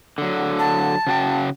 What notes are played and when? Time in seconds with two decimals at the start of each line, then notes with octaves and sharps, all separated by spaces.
0.18 D3 F#3
0.59 A5
1.07 C#3 F#4 G5